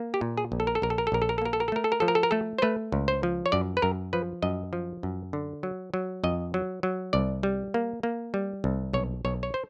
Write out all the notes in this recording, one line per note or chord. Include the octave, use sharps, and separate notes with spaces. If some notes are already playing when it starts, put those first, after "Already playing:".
Already playing: A#3
G4
A#2
G#4
A#1
A4
A#4
A4
A#1 A#4
A4
A#4
A4
A#1 A#4
A4
A#4
A4
A#3 A#4
A4
A#4
A4
A3 A#4
A4
A#4
F3 A4
A#4
A4
A#4
A3 A4
C5
A3 B4
C#2
C5
F3
C#5
F#2 D5
B4
F#2 A#4
F3 B4
F#2 D#5
F3
F#2
D3
F#3
F#3
F2 D#5
F#3
F#3
C2 D5
G3
A#3
A#3
G3
C2
B1 C#5
B1 C#5
C#5
C5